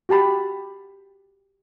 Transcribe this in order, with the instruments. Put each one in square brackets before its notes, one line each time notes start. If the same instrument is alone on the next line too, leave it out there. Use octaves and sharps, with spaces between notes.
[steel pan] F#4 G4 A5 B5